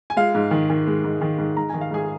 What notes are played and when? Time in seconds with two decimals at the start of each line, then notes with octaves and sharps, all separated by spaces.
0.10 G#5
0.17 G#3 F4 F5
0.35 G#2
0.51 D#3
0.70 D#3
0.87 G#3
1.04 G#2
1.21 D#3
1.38 G#2
1.56 G#2 A#5
1.69 D#3 G#5
1.81 F5
1.91 G#2 G#4 G#5